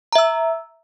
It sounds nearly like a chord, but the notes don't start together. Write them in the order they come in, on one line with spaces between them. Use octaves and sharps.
A#5 E5 E6